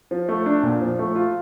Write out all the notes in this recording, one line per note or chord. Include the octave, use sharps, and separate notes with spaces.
F3
A3
D4
A#2
F3
A3
F4